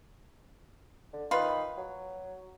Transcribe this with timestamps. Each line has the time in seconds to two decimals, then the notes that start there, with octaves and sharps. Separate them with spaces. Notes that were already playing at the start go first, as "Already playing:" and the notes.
1.13 D3
1.31 D#3 F4 B4
1.78 F#3